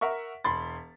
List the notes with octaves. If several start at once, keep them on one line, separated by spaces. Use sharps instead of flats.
A#4 E5 F#5 C#6
E1 B5 C6 A6